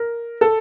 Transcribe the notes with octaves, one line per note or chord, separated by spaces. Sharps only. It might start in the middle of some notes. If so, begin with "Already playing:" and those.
Already playing: A#4
A4